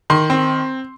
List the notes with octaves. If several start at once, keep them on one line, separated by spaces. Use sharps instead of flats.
D#3 C6
C4